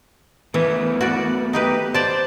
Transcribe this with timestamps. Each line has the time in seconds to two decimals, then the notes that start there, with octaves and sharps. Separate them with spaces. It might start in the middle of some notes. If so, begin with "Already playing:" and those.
0.54 E3 A3 B3
1.01 F#4 D5
1.53 D#4 G4 B4
1.94 C5 D5 A5